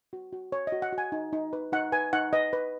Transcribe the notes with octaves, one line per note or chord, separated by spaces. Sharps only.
F#4
F#4
C#5
D#5
F#4
F#5
F#4
G#5
D#4
D#4
B4
D#4 F#5
B4 G#5
D#4 F#5
B4 D#5
B4